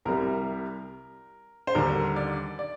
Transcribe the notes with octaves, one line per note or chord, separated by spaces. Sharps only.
C2 C3 G3 A#4
C5
D#2 D3 G3 A#4
D5
D5